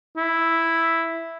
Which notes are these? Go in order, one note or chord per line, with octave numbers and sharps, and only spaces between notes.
E4